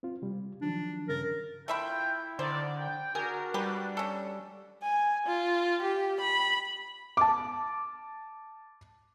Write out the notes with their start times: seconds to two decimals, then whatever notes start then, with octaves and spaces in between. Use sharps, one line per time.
0.03 C4 F4
0.22 C3 G3
0.62 D#3 F3 F#3 D4
1.09 G2 C#3 A#4 A6
1.68 A3 E4 F4 E5 G5 B5
2.39 D3 D#3 C5 D5
2.79 G5
3.15 D4 F#4 G#4 A#4
3.54 G3 G4 B4
3.97 C#4 A4
4.83 G#5
5.26 F4
5.82 G4
6.20 B5
7.17 A5 D6